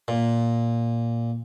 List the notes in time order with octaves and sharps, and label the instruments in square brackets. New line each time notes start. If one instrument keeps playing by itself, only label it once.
[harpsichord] A#2